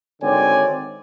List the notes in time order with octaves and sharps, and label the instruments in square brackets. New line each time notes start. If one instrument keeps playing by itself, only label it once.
[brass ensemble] G#1 D3 C4 C#5 D5 G#5